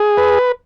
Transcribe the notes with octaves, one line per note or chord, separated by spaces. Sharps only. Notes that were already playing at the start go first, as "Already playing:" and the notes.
Already playing: G#4
B4